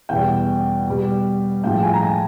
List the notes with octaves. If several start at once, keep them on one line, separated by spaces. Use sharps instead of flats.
E2 B2 G3 G5
B2 G3
A2 F3 G#3 G5
G#5
A#5
A5